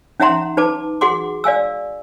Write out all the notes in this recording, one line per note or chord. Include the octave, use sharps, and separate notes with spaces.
C#4 D#4 E5 F#5 A#5 C6
D#4 B4 A5 D6
F#4 G#4 F#5 C6 D6
D5 F5 G#5 E6